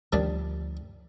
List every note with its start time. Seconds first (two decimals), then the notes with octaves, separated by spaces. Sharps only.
0.13 D2 D#3 F3 G3 D4